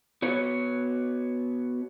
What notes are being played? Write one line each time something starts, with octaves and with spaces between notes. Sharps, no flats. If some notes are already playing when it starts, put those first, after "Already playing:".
B3 F#4 C#5